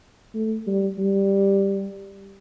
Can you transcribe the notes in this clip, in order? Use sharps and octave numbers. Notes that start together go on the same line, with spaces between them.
A3
G3
G3